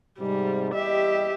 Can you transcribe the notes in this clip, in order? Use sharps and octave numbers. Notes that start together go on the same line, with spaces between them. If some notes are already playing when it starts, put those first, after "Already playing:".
G#2 C3 G3
E2 G3 G4 D#5 E5